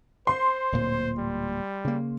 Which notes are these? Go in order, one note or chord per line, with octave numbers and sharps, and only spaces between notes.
C5 C6
D1 A#2
G3
C#3 A#3